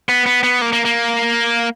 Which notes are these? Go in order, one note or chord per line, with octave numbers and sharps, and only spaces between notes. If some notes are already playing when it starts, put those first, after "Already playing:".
B3
B3
B3
A#3
A#3
A#3